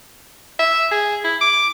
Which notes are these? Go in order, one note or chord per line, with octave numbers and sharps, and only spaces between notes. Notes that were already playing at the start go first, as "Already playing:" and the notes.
E5
G#4
E4
D6